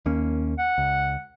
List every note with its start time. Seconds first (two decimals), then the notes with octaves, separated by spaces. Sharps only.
0.06 D#2 A#3 C#4
0.58 F#5
0.78 C#2